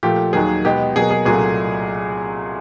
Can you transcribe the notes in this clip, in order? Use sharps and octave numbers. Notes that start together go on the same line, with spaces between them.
A#2 F3 A3 G4
D#2 D#3 F#3 A#3 G#4
B2 G#3 B3 G4
B2 F#3 A#3 G#4
G#4
C2 A#2 F#3 A3 G#4